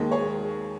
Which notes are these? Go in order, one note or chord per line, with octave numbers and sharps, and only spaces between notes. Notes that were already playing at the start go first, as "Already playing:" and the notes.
Already playing: D#2 D#3 G#3
G#4 C#5